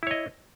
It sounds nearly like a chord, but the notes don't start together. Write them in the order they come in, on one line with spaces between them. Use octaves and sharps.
E4 C#5 D#5